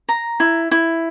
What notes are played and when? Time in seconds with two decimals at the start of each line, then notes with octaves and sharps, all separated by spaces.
0.09 A#5
0.40 E4
0.71 E4